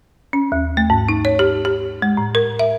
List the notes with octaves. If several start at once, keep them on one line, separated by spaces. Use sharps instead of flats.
C#4
D#2
A3
G#2
D#4
C#5
G4
G4
G#3
A2
A#4
E5